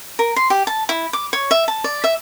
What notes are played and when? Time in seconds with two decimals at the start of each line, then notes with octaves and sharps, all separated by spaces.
0.19 A#4
0.36 C6
0.50 G4
0.67 A5
0.89 E4
1.13 D6
1.33 C#5
1.51 E5
1.68 A5
1.84 D5
2.04 E5